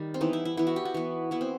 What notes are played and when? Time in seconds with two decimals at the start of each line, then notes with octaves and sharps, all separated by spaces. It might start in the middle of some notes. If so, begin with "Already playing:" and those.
Already playing: D#3 G3
0.14 C4
0.21 E3 B3 D#4
0.33 E4
0.45 E4
0.57 E3 B3 E4
0.67 F#4
0.76 G4
0.85 F#4
0.94 E3 B3
1.31 E3 B3 E4
1.41 C4